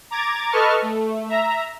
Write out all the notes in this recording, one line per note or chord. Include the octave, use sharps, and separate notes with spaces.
A#5 D6 G#6 A6
A4 B4 D#5 A5 C#6 F6
A3
E5 A#5